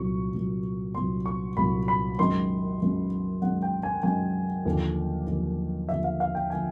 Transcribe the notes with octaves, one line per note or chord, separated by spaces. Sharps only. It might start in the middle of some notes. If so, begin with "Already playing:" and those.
Already playing: C2 A#2 F#3 C#6
C2 A#2 F#3
C2 A#2 F#3 C6
C#6
C2 A#2 F#3 B5
B5
F#2 D#3 G#3 C6
F#2 D#3 G#3
F#2 D#3 G#3 F#5
G5
G#5
F#2 D#3 G#3 G#5
D#2 D3 F3 A#3
D#2 D3 F3 A#3
D#2 D3 F3 A#3 E5
F5
F5
G5
D3 F3 A#3 G#5